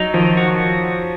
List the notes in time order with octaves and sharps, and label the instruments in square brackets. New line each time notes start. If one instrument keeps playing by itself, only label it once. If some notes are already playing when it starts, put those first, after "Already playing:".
Already playing: [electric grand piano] F#3 [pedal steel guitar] D#4
[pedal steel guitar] D#3 [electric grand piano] F3
[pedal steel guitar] F#4